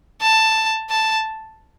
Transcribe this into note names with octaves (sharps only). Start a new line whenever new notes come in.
A5
A5